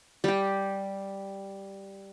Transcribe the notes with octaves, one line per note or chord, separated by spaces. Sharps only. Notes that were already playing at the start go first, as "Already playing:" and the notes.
G3 G4